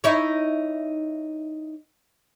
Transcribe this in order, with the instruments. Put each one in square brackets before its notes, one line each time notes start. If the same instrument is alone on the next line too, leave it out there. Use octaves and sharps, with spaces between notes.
[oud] D#4 E4 C#5